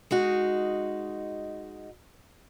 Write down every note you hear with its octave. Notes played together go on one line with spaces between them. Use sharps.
G#3 D#4 F#4